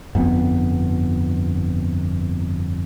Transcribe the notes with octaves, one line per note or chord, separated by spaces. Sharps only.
G1 F2 B3